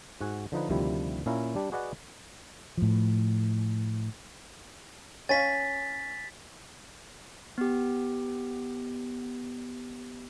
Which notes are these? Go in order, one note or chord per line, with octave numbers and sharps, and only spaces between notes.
G#2 F#4 F#5 G#5
D3 F3 D#4 B4
D2 C3 D#3 F3 G3 E4
A#2 C#4 E4 F5 A#5
G3 D4 G4
F#4 G#4 B4 D5 D#5 F#5
A2 F3
C#4 C#5 F5 G#5 A6 B6
B3 G4